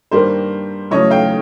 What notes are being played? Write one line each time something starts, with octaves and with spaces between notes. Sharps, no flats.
G2 D#3 G3 A#3 A#4 C5
E2 C#3 F#3 A3 C#5 D#5
F5 G5